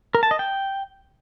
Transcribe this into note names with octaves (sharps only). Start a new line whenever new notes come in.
A#4
A5
D#5
G5